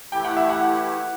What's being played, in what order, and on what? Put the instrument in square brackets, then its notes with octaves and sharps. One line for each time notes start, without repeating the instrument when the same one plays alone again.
[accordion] E3 A3 E4 G4 [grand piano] G5
[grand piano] F#5
E5
F#5